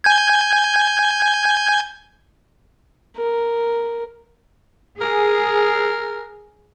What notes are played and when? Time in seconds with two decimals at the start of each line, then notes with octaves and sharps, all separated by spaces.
0.04 G#5 G6 G#6
3.17 A#4
5.01 G#4 A#4